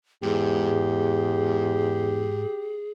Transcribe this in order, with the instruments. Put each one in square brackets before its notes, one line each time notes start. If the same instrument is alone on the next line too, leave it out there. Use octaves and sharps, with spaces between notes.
[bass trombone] E2 [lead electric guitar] G#2 [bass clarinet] G4 [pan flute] G#4